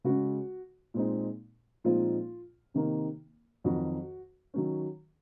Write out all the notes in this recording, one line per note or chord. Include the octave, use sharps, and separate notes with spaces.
C#3 G#3 C#4 F#4
A#2 G#3 C4 D#4
A#2 F3 G#3 C4 D#4 F4
C3 D#3 A#3 D#4
F2 D#3 F#3 F#4
D#3 F#3 C#4